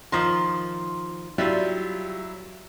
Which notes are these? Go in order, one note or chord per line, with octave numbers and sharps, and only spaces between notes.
D#3 F3 C6
F#3 G3 E4 F4